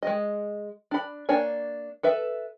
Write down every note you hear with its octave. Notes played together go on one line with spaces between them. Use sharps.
G#3 D#5
D4 B5
A#3 D4 C#5 G#5
A4 B4 E5